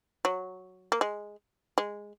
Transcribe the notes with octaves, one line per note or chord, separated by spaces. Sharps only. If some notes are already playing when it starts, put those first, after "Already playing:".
F#3
A#3
G#3
G#3